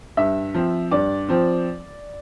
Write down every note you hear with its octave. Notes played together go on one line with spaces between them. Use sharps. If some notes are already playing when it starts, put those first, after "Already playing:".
G2 E5
F3 C4
G2 D5
F3 C4